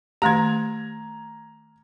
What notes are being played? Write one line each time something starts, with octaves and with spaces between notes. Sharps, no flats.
D#3 A3 G4 A#5 G#6